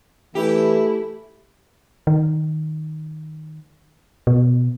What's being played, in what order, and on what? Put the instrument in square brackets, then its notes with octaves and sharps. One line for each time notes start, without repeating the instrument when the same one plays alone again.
[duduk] E3 [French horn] A3 [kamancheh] E4 [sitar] G4
[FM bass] D#3
B2